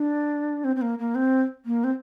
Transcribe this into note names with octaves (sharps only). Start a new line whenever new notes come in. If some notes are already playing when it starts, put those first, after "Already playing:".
Already playing: D4
C4
C4
A#3
A#3
C4
A#3
C4